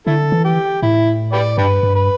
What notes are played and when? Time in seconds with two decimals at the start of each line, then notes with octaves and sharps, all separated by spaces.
0.07 D3 E4 A4
0.32 E3
0.45 G4
0.82 A2 E4
1.33 G4 B4 D5
1.58 G2 D4 G4 B4
1.83 G2
1.95 B4